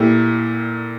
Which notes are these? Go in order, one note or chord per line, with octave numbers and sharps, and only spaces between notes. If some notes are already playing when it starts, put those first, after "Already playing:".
Already playing: A#2 A3 E4 G4